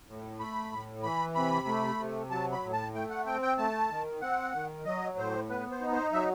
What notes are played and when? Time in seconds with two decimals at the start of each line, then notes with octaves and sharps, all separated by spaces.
0.08 A2
0.39 A3 B5
0.72 A2
1.03 E3 B5
1.35 C3 B5
1.67 A3
1.99 C3
2.31 F#3 A5
2.52 B5
2.63 A2
2.73 A5
2.95 A3 G5
3.10 F#5
3.26 C4 G5
3.42 G5
3.58 A3 A5
3.90 D#3
4.21 C4 F#5
4.54 D#3
4.85 F#3 D#5
5.18 A2 C5
5.49 B3 B4
5.71 C5
5.81 D#4
5.92 C5
6.13 F#3 E5